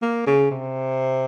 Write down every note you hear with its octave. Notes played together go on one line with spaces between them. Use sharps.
A#3
C#3
C3